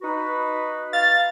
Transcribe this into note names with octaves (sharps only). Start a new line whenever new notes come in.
D#4 F#4 B4
F5 A6